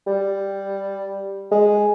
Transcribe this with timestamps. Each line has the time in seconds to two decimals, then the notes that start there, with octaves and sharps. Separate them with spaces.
0.07 G3
1.52 G#3